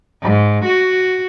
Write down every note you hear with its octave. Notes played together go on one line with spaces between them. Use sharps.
G#2
F#4